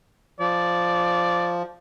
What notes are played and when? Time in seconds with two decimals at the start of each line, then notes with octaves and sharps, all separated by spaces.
0.40 F3 D5